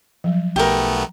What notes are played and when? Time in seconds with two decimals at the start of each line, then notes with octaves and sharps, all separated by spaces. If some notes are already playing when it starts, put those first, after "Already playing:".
0.24 F3 F#3
0.56 B1 A3 B3 G4 A#4